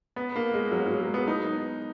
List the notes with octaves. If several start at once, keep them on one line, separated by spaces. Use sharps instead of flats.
B3
A#3
G#3
F#3
F#3
G#3
B3
D#4